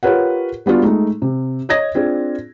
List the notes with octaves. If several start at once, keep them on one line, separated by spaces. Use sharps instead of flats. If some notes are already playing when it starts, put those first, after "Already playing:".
F4 G4 A#4 B4 C#5 F#5
G3 B3 D4 F4 F#4
G#3 A3 D#4
C3
C#5 D#5 D#6 G#6 A#6
C4 D4 F4 G#4